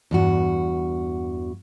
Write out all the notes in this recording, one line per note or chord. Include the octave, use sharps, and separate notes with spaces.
E2 G2 F#4